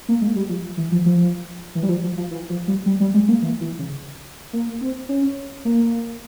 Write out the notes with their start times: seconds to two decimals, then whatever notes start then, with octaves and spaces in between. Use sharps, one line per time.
0.09 A#3
0.22 G#3
0.36 G3
0.49 F3
0.77 E3
0.92 F3
1.06 F3
1.75 E3
1.83 G3
1.89 F3
2.03 F3
2.17 F3
2.31 E3
2.50 F3
2.68 G3
2.86 G3
3.00 G3
3.14 G#3
3.28 A#3
3.42 E3
3.61 E3
3.79 C#3
4.53 A#3
4.81 C4
5.09 C#4
5.65 A#3